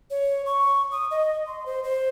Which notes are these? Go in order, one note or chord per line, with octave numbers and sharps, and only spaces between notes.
C#5
C#6
D#6
D#5
C6
C5
C5